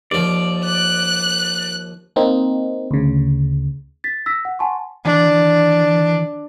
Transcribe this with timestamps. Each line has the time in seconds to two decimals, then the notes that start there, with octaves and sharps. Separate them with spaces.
0.11 D#2 F3 D5
0.65 F#6
2.16 A#3 C4 D#4
2.91 D2 C#3
4.04 A6 B6
4.26 E6 A#6 B6
4.45 F#5
4.59 F#5 G#5 A5 C6 C#6
5.05 D#3 E3 D4